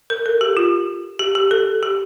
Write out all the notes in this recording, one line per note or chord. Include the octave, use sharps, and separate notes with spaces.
A#4
A4
G4
F4
G4
G4
A4
G4